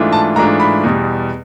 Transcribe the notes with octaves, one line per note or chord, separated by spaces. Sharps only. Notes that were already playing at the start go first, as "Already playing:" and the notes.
Already playing: G#2 E3 A3 D4 F4
A5
G#2 E3 A3 D4 F4 A#5
B5
E2 B2 G3